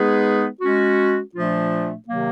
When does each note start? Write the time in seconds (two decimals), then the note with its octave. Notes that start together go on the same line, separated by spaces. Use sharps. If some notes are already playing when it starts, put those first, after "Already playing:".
Already playing: G#3 B3 D#4 G#4 B4
0.61 G#3 C#4 F#4
1.34 A#2 F3 A3 D4 F4
2.08 C3 D#3 F#3 A#3